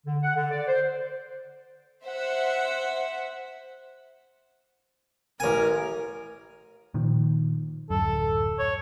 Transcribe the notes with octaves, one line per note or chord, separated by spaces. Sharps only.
D3
F#5
D3
D5
C5
C5 E5 F#5
A1 A#4 G#5
A#2 D#3 F3
D1 F#2 A4
C#5